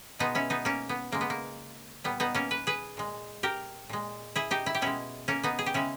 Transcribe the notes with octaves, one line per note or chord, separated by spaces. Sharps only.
B2 G#3 B3 D#4
C#4 E4
B3 D#4
A#3 C#4
B3
C#3 G#3 A#3
B3
A#3
A#2 G3 B3
B3 D#4
A#3 C#4
B4
G#4 B4
A#2 G#3
G4 A#4
A#2 G#3
E4 G#4
D#4 G4
E4
G4
B2 G#3 C#4 E4
A#3 C#4
B3 D#4
G#4
G4
C#3 G#3 C#4 E4